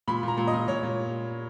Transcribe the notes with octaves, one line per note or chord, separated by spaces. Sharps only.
A#2 B5
A#2
A#5
A#2
D#5
A#2
A#2 C#5
A#2